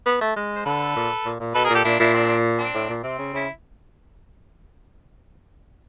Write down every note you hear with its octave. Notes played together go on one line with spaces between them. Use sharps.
B3
A3
G#3
C5
D3 A4 B4
A#2
A#2
A#2
B2 A4 B4
G#4 A#4
A#2
G4 A4
A#2 D4 E4
A#2 D4 E4
C4 D4
C4 D4
A2
A#2
C3 C4
C#3
C#3 E4